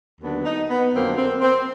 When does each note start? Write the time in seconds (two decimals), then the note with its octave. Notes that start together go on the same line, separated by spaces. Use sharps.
0.21 D#2 D3 F#3 B3 D4
0.45 D#4
0.69 B3
0.94 F2 D3 F#3 A#3 C4
1.17 C4
1.41 C4